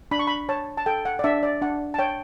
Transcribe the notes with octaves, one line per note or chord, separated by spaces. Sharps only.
D4 B5
C#6
B5
C#5 A5
A5
A4 G5
F#5
D5
D4 E5
D5
D4 F#5
A5
C#5 G5